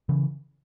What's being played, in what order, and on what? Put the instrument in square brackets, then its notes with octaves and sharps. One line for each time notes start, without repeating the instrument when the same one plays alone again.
[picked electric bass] C#3 E3